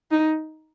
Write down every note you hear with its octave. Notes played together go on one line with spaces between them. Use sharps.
D#4